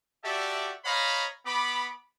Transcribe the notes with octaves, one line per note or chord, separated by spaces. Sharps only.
F#4 G4 A4 D5 E5
C5 C#5 D#5 F5 A#5 B5
B3 B5 D6